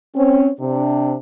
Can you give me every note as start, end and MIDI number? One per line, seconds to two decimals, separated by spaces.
0.16 0.50 60
0.16 0.50 61
0.60 1.15 48
0.60 1.15 62